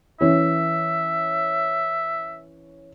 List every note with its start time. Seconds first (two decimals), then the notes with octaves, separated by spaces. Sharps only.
0.21 E3 C#4 E5